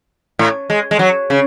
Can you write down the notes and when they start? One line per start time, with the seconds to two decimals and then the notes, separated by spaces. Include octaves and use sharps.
0.39 A2
0.70 G#3
0.91 G#3
0.99 F#3
1.30 C#3